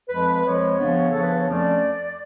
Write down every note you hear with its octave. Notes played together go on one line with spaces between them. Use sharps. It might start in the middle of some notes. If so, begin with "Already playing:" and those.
F2 F3 G#3 B4
F2 F3 G#3 C#5
C#3 F3 B3 D4
A4
C#3 F3 B3 D4
B4
C#5
F2 F3 A3 C#4 D5